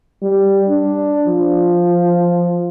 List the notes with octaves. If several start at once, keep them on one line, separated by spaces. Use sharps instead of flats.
G3
D4
F3